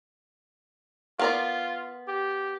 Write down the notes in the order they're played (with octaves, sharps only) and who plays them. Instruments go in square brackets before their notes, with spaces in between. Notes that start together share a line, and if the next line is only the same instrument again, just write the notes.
[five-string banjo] B3 A#4 D5 [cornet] F4
[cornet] G4